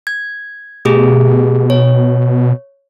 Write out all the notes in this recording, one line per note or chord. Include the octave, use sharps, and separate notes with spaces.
G#6
B2 A3 G4 G#4
C#5